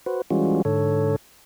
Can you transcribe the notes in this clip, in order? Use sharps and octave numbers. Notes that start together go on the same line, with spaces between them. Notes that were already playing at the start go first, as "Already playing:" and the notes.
F#4 B4 C5
E3 G3 G#3 C#4 F4 F#4
G#2 D3 A4 C#5